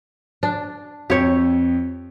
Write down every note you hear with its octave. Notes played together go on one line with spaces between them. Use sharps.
D4
F2 G4 C#5